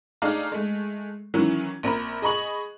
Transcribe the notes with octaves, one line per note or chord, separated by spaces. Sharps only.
A3 D4 D#4 G#4 D5 F5
G#3 A3
D#3 E3 F#3 C#4 E4
A#1 C4 A#4 B5
G#4 D#5 B5 C#6 F#7